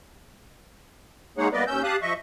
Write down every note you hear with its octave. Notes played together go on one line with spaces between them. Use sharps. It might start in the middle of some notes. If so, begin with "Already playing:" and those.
G#3 A#3 D#4 G#4 C#5 F#5
G3 A#3 B3 B4 D5 D#5
D#2 C#4 E6 G6
G4 F5 A5 D#6 F#6
F3 D#5 E5 C#6